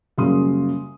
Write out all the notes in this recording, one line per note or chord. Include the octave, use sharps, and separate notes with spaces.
F#2 C#3 G3 A#3 C6 D#6